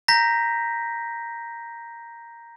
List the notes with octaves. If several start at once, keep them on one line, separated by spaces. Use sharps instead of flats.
A#5 G6 A#6 B6